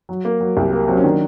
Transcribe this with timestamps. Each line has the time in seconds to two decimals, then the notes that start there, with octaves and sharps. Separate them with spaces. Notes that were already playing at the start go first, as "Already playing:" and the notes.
0.09 F#3
0.25 A#3
0.40 F#3
0.57 C2 G4
0.72 A#3
0.88 F#3 C4
0.97 C#4
1.04 D#3 D4